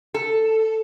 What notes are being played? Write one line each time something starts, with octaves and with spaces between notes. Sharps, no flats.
A4